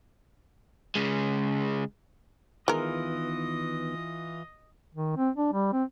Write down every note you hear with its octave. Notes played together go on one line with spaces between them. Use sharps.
C#3 G#3
D#3 E3 G#3 B3 F4 A#4 D#5
D#3
C4
D4
G3
C4